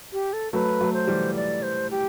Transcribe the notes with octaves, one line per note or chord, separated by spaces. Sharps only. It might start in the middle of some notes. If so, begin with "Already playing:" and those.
G4
A4
F#3 A3 B4
F#3 A3
C5
E3 G3
D5
C5
G4